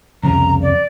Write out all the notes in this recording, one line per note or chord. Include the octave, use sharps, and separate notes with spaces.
C2 F2 C#3 A#5
D5